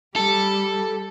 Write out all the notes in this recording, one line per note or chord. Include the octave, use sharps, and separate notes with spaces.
G3 A4